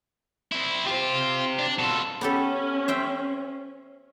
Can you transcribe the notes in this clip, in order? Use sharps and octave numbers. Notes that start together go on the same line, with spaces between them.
C4 E4
F4 G4 C5
D4
B2 F4 A4
B3 C#4 G4 A4
C5 E5 G5